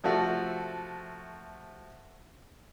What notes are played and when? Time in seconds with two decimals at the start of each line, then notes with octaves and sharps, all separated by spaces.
0.04 C3 F3 A3 F#4 A4